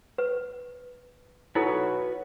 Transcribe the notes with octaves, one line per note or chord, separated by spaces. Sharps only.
B4
D#4 E4 F#4 A4 B4 C#5